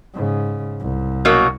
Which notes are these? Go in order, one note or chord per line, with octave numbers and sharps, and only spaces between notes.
G#2 C#3
C2
B2 F#3 A#3